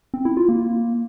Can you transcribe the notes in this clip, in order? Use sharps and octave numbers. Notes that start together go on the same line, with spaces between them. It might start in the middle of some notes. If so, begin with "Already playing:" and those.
C4
E4
F4
A#3